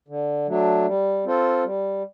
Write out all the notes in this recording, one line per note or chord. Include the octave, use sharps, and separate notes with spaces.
D3
F#3 A3 D4
G3
C4 F4 A4 C5
G3